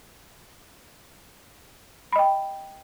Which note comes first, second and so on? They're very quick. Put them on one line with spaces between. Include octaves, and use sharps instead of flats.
B5 D#5 G5